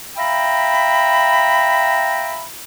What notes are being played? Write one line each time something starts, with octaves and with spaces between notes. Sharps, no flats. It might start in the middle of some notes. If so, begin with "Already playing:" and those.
E5 F5 G5 A#5 B5